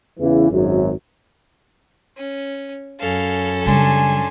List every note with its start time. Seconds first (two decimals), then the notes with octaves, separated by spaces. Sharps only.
0.20 E2 C#3 E3
0.50 G#1 F#2
2.17 C#4
3.00 F#2 C#4 A4 F5
3.65 C#3 G3 D4 G#5 C6